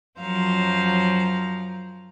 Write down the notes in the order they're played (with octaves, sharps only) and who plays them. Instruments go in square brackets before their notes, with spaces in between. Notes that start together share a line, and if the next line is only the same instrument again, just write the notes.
[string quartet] F#2 F3 F#3 C5 F5 A#5